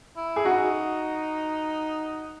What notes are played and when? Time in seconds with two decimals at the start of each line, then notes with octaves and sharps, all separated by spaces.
0.16 E4
0.36 G#4
0.45 D#4 F#4